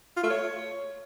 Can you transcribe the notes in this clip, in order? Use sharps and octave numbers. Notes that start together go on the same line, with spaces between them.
F4
A3
C#5